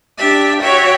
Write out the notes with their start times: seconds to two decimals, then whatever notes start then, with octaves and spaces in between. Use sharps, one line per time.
0.17 D4 G4 E5
0.61 F#4 C#5 E5 G5